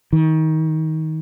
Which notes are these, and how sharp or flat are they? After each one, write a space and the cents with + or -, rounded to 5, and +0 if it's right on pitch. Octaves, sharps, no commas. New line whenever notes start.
D#3 +25